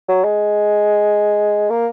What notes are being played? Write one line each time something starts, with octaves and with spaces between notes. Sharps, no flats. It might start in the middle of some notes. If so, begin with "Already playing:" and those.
F#3
G#3
A#3